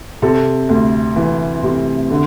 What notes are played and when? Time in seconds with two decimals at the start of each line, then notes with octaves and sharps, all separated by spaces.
0.22 C3 A4
0.69 D2
1.16 E3
1.63 C3
2.10 D3